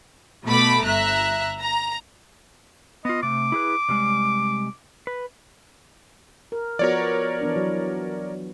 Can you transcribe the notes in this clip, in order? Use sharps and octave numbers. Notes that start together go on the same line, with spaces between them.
B2 A3 A4 B5 D6
G1 E5 A#5 F#6
A#5
B3 F4 D#5
C3 A3 D6
E4 G#4 B4
C3 G3 G#3
B4
A#4
F3 B3 F#4 A#4 C#5 D5
E3 B3 D4
F#3